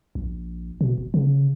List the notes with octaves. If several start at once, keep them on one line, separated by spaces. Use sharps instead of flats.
A#1
B2
E1
C#3